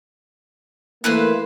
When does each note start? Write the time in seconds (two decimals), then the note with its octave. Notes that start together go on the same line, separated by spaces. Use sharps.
1.04 E3 A3 A#3 E4 B4 C5